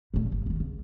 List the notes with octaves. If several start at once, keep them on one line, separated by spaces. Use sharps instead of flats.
A#2 A3
G1 A2
D#3 F3
C#2